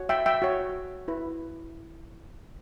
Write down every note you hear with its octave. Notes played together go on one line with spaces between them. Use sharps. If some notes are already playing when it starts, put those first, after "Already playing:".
Already playing: F#4 C#5
E5 G5
E5 G5
F#4 C#5
E4 B4